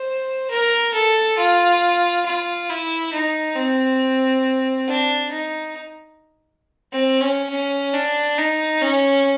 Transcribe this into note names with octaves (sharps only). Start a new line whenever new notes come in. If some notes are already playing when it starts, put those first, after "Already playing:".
Already playing: C5
A#4
A4
F4
F4
E4
D#4
C4
D4
D#4
C4
C#4
C#4
D4
D#4
C#4